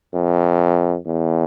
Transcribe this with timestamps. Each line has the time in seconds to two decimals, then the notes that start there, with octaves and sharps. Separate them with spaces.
0.14 F2
1.06 E2